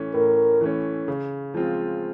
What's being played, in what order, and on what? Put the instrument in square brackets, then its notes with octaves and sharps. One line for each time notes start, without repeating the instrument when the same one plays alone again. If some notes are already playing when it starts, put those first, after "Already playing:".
Already playing: [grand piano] A2 E3 A3 C#4
[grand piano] A2 [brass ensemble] A#4
[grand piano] E3 A3 C#4
C#3
F3 G#3 C4 F4